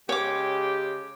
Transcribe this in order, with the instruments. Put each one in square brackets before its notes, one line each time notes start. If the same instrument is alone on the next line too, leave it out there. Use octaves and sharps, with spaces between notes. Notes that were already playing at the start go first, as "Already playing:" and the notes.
[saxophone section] C#3 G#3 G4 [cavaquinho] C#5 D6